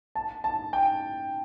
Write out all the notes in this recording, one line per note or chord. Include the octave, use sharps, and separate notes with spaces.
A5
A5
G5